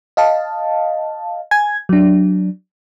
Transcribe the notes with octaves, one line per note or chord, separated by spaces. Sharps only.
D#5 F5 A5
G#5 G#6
F#3 D4